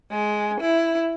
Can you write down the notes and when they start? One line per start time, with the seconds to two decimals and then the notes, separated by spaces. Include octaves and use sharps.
0.11 G#3
0.61 E4